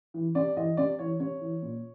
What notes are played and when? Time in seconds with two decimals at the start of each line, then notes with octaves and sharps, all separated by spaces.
0.14 E3
0.35 C3 D5
0.56 E3 D#5
0.77 C3 D5
0.99 E3 C#5
1.20 C3 C#5
1.41 E3
1.63 A#2